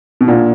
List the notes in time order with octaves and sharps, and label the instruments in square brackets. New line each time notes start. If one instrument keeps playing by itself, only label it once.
[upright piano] B2
[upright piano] A#2 [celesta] D4 F4 A#4 D5 F#5